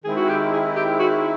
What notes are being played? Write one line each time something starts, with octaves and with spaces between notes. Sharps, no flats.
D#3 G#3 C4 E4 G#4
F#4
G4
G#4
G4
F#4